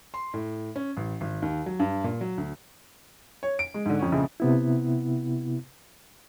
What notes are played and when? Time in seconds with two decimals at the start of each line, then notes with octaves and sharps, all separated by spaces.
0.14 C6
0.34 A2
0.76 C#4
0.97 A1
1.21 G#1
1.42 D#2
1.66 F#3
1.79 G2
2.04 A#2
2.21 F#3
2.38 D2
3.43 C#5
3.59 D7
3.74 G#3
3.86 G#2 D3
3.99 F2 C#4
4.12 A#1 F2 C#3
4.40 C3 B3 E4